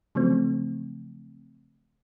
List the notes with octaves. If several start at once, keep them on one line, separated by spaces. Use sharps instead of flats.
C#3 F3 F#3 A3 C4